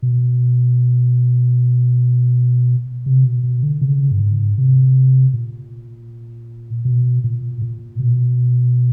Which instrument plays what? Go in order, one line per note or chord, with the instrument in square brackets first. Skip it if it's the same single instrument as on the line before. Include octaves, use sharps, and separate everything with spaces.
[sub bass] B2
C3
B2
B2
D3
C#3
G2
G#2
C3
A#2
B2
A#2
A#2
B2